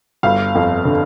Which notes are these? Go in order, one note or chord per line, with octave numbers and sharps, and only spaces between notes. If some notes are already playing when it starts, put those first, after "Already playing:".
G1 F5
F2
D3